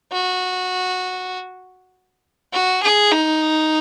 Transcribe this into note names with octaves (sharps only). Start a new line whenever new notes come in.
F#4
F#4
G#4
D#4